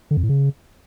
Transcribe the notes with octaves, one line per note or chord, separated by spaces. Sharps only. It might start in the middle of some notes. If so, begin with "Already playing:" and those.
D3
F2
A2
C#3